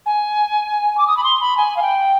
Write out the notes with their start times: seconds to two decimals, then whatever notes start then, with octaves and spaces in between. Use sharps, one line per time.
0.06 G#5
0.98 D6
1.07 D#6
1.17 B5
1.24 C6
1.41 B5
1.57 G#5
1.77 F5
1.82 G5